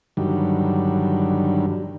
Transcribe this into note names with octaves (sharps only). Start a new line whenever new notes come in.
G2 D3 D#3 F#3 G3